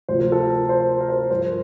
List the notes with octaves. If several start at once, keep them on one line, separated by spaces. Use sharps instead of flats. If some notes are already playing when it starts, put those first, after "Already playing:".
D2 C3 F3 C5
A#4
A4
A#4
C5
A#4
C5
A#4
G2 F3 C5